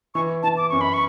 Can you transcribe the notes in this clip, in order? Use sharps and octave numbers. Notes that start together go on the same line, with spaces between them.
E3 C#6
E3 A5
D6
F#2 C#6
B5
C#6